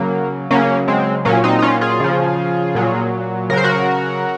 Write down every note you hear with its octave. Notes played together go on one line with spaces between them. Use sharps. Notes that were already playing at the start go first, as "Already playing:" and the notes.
Already playing: C#3 F#3 A#3
C#3 F#3 A#3 C#4
G#3 C4
A#2 F#3 A#3 C#4
C4 D#4
D#4
C#4 F4
F4 G#4
C#3 F3
A#2 F#3
C#3 F#3 A#4 C5
F#4 A#4